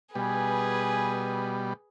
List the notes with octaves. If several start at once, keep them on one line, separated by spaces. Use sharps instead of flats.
B2 G3 G#4 B4 G#5